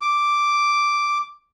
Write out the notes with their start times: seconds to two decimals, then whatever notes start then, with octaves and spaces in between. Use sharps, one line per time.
0.01 D6